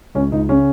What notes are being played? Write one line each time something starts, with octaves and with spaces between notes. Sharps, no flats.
C#2 C#4
C#2 D#4
C#3 C#4